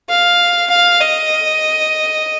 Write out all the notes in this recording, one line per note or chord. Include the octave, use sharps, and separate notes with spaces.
F5
F5
D#5